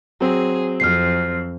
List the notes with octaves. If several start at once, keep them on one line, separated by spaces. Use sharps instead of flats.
F#3 C4 G#4
F2 F6 C7